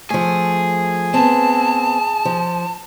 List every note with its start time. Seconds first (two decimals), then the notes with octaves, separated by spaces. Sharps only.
0.10 F3 A3 G#4
1.14 B3 C4 A5
2.25 F3